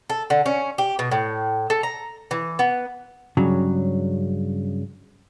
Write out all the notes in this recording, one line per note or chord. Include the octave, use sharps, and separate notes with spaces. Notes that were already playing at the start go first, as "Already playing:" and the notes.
A4
D3
C#4
G4
B2
A2
A4
A#5
E3
B3
G2 C#3 F#3